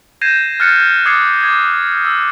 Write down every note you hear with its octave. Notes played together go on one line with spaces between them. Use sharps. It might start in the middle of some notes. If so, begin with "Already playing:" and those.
G6 G#6 A#6 C7 D#7 E7
F6 F#6 A6 C#7
D6 D#6 G#6 A6 C7 C#7
D6 G#6
E6